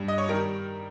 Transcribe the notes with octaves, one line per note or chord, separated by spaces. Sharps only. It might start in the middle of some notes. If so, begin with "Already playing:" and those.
Already playing: G2 G3
D#5
C#5
D#3 G3 A#4